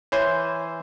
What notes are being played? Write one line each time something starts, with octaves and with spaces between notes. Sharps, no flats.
E3 C5 C#5 G#5